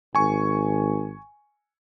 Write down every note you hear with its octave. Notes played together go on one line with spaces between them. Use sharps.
G#1 G#5 C#6